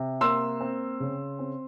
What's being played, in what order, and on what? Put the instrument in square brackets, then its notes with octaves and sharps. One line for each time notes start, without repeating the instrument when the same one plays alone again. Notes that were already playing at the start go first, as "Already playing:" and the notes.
Already playing: [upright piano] C3
A#3 C6 E6
C4
C#3
C4